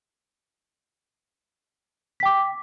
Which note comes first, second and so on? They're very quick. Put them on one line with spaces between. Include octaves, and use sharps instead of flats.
B6 G5 D6